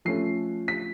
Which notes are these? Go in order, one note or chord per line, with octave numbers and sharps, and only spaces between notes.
F3 A3 C#4 C7
B6